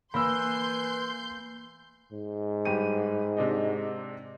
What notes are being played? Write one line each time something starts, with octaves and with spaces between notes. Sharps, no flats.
E3 A#3 B5 C6 E6 G6
G#2
G2 G4 D#7
C3 D4 D#4